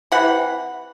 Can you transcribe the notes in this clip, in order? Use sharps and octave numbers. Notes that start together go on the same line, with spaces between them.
C3 E3 F#5